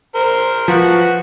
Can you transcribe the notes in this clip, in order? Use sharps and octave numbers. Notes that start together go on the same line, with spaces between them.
A#4 C5
F3 F#4 B4